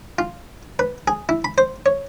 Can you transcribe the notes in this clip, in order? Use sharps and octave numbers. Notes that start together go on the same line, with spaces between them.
F4
B4
G#4
E4
B5
C5
C#5